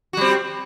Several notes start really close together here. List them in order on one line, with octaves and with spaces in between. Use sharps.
F#4 G3 C4